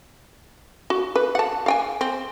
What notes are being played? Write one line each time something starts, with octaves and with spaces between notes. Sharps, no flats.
F#4
B4
F#5 A5
F5 G5 G#5
C4